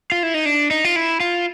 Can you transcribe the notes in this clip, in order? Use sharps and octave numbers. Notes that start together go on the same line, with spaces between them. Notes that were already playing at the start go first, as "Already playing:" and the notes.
F4
E4
D#4
D4
D#4
F4
E4
F4